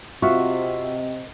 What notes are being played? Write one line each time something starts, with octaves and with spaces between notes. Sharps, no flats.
C3 C4 F4 F#4 D#5 E5 C#6